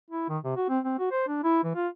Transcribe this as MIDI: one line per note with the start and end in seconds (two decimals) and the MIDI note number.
0.11 0.27 64
0.29 0.38 51
0.44 0.56 48
0.57 0.65 66
0.69 0.79 60
0.84 0.97 60
0.99 1.07 66
1.12 1.26 72
1.28 1.40 62
1.44 1.64 64
1.64 1.73 52
1.75 1.88 65